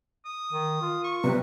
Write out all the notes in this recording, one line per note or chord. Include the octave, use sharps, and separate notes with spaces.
D#6
D#3
F4
C#6
C3 G3 B4